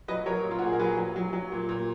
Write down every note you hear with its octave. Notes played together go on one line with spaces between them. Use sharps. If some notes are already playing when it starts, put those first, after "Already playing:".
F#3 B4 D#5
F#3 A#4 C#5
A#2
F4
F#4
A#2 G#4
A#4
F#3 G#4 B4
F#3
F#3
F#3
A#2
A#2